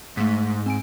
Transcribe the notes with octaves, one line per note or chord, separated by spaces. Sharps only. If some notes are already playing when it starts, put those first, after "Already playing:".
G#2 A3 B6
C4 G#5 D7